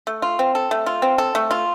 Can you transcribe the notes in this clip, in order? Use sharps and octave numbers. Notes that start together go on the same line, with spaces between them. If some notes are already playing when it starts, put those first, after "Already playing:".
A3
F4
C4
A4
A3
F4
C4
A4
A3
F4